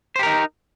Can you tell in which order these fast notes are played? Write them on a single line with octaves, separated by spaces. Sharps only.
C5 G4 A#4 D#4